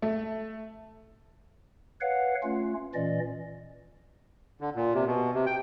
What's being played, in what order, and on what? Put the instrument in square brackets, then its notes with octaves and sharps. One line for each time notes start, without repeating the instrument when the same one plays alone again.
[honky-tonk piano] A3
[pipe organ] B4 C#5 F5 F#5
A3 C#4 F4
A#2 E3 C#4 D5 D#5
[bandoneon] D3
A#2
C3
B2
C3
G5